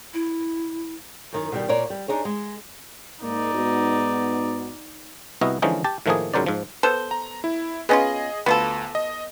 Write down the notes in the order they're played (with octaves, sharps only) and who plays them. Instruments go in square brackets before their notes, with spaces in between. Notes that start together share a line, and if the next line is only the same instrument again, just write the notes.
[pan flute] E4
[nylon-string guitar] F#2 D#3
B2 D#3 G3
A#2 A#4 C#5 D5
G3
D4 D#4 G#4 C#5
G#3
[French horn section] G#2 A#3 A#4 [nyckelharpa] D#4 D5
[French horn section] G#2 B3 F#4
[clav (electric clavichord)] C2 B3 E4 F#4 D#5
D3 E3 F3 G#3 C#4 D#4
G4 A5
A2 D#3 F3 A3 A#3 G#4
C#2 G#2 F#3 A#4 C5 D5
G#2 F3
[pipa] B3 A4 C5
[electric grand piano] A#5
E4
[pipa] B3 C#4 F4 [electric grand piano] G#4 D#5
[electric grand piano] D2 [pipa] B3 F4 A4
[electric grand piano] D#5